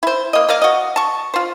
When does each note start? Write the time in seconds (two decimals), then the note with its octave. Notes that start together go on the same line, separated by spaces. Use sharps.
0.03 E4 C5
0.33 A#3 D#5
0.49 A#3 D5 D#5 F5
0.62 F#4 D#5
0.96 A5 C#6
1.34 F4 C5